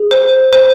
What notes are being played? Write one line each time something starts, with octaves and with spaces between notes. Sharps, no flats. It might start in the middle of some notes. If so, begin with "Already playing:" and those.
Already playing: G#4
C5
C5